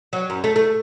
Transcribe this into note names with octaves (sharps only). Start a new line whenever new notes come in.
F#3
F#2
A3
A3